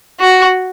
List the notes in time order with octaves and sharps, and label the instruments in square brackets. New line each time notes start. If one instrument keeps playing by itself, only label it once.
[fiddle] F#4